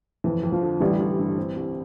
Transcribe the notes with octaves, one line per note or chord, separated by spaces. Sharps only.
F2 E3
F2
F3
D3
A1 E3 G3
A1
G2
C4
C2